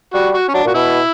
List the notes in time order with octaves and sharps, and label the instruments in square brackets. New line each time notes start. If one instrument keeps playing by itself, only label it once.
[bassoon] G3 [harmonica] F#4
[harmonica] F#4
C#4
[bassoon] F#3 [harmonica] D4
[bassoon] A#2 [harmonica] F#4
[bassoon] B2 [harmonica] E4